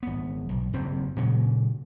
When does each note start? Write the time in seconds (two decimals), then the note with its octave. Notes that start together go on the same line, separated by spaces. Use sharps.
0.03 G#1 B3
0.49 B1
0.73 F#1 E2 G2 C4
1.16 A#2 C#3 F#3 G#3